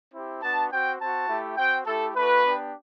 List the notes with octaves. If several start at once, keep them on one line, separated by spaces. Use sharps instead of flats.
C4 E4 G4
B3 D4 F#4 A5
C4 F#4 G5
C4 F#4 A5
A3 E4 G4
C4 F#4 G5
A3 E4 G4 A4
A3 D4 F#4 B4
B3 D4 G4